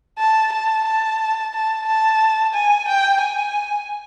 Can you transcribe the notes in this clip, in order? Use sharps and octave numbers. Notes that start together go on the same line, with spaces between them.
A5
A5
A5
A5
A5
G#5
G5
G#5